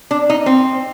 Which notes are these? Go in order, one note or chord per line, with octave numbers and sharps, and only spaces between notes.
D4
D#4
C4